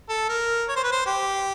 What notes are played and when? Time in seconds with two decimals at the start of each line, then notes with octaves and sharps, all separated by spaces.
0.09 A4
0.29 A#4
0.68 C#5
0.76 C5
0.83 B4
0.92 C5
1.06 G4